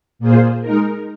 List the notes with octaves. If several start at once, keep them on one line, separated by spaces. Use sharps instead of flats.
A#2 A#3 F4 G#4 C5
G#3 D#4 A#4